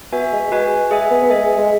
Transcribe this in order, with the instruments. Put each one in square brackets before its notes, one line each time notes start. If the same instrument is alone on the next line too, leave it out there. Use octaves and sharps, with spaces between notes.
[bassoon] B3 [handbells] F#4 E5 G#5
[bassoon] G#3
[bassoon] G#3 [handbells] F#4 B4 G#5
[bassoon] G#3 [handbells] G#4 E5 G#5
[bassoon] B3
B3
[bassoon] G#3 [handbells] G#4 E5 G#5
[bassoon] G#3